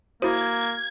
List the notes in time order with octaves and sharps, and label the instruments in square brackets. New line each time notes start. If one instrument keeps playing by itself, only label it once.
[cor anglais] A#3 [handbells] E4 C5 [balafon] F#4 [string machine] G#6